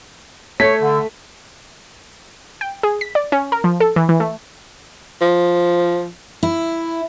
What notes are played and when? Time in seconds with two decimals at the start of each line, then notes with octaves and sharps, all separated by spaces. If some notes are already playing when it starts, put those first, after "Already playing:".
0.60 A3 C#5 B6
0.81 D3
2.61 G5
2.83 G#4
3.01 B6
3.15 D5
3.32 C#4
3.52 A#4
3.64 F3
3.80 A4
3.96 E3
4.09 E3
4.20 A3
5.21 F3
6.43 E4